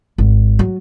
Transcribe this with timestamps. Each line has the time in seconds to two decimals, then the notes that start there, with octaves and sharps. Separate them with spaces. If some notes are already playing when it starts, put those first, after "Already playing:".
0.18 G#1
0.59 F#3